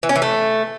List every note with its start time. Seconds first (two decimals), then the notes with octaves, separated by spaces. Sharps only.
0.03 E3
0.09 C#4
0.16 E3
0.22 A3